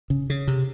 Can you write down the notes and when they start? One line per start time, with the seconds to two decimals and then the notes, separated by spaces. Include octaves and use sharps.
0.10 C#3
0.30 C#3
0.48 C3